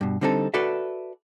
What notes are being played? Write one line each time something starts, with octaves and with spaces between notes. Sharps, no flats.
G2 B2
D3 G3 C4 D#4 F#4 A4
F#4 A4 B4 D5 E5